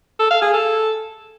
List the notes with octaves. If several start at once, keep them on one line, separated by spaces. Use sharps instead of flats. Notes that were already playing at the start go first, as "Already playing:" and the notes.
A4
F5
G#4
A4